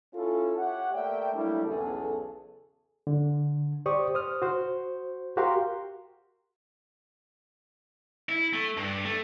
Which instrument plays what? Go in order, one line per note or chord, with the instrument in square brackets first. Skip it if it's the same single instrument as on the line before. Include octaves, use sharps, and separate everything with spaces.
[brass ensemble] C#4 E4 F4 A4
G4 C#5 E5 F#5
A3 A#3 D5 E5 G5
F#3 G3 A3 A#3 D4 E4
B1 E2 C#3 G#4 A4
[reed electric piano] D3
G4 C5 D5 C#6 D#6
C5 D#6 F6
F#4 C5
F#4 G4 A#4 F5 A#5 C6
[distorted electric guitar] E4
A3
G2
A3